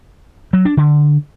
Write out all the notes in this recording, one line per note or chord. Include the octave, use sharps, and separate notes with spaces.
F#3
D4
D3